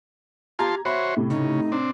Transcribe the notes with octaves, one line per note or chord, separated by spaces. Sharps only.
F4 G4 A5 A#5 C6 G#6
F#4 C5 C#5 E5 B5
A2 C3
C#3 D#4
C4 D4